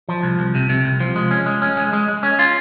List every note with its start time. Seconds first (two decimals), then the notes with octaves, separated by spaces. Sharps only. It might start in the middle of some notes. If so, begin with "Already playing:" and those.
0.09 F3
0.23 C2
0.39 C2
0.55 C3
0.69 C3
0.85 C2
1.00 F3
1.16 G#3
1.31 C#4
1.46 G#3
1.62 C#4
1.77 G#3
1.93 G#3
2.08 G#3
2.23 C#4
2.39 F4